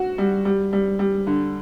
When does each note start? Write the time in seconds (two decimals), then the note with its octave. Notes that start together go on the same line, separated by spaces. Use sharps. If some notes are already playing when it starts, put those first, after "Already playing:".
Already playing: F#4
0.18 G3
0.45 G3
0.73 G3
0.99 G3
1.27 D3